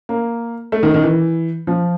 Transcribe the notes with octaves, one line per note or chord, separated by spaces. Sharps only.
A#3
A3
D#3
D#3
E3
F3